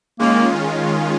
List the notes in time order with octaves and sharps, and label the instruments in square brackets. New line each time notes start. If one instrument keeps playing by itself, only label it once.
[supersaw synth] D#3 G#3 C#4 F4 [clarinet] A#3